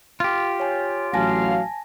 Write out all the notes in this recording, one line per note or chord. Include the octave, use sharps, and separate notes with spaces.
F4 G4
C#5 G#5
A1 F#3 F5 G#5 A5 A#6